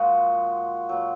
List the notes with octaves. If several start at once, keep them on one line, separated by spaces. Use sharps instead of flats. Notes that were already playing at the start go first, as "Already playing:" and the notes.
Already playing: A#2 F3 G#3 F#4
A#2 F#3